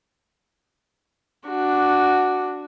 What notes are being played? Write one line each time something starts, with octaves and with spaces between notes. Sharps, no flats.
D4 F#4